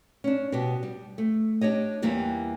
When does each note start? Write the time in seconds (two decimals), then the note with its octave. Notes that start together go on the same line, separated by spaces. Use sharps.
0.24 C#4 D4
0.52 B2 B3 G4
0.83 G3
1.18 A3
1.61 D4 G4 C#5 D#5
2.02 E2 E3 G3 A#3 G4